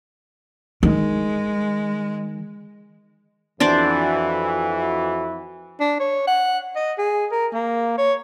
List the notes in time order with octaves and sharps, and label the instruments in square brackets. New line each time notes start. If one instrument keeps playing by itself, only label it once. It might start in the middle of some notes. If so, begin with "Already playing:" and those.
[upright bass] D#3 [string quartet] G#3
[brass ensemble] F2 E3 F#4 [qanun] D4 C5 D5
[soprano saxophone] D4
C#5
F#5
D#5
G#4
A#4
A#3
C#5